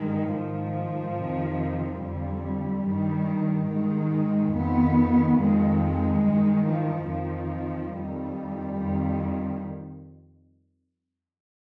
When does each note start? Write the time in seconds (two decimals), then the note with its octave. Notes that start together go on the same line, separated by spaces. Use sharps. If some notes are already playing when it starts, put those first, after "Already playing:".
Already playing: G2 D#3 G#3
0.31 G#2 D#3 F3
1.17 F2 C3 D#3
2.01 F2 D3 G3
2.85 G2 D#3
3.70 G#2 D#3 G#3
4.55 F2 D#3 B3
5.39 F2 D#3 G#3
5.82 G#3
6.24 G2 D#3
6.67 F3
7.09 F2 D#3 F3
7.94 F2 D#3 G3
8.79 F2 D#3